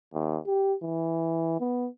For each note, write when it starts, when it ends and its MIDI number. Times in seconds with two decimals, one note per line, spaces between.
0.14 0.38 39
0.46 0.74 67
0.83 1.57 52
1.60 1.87 59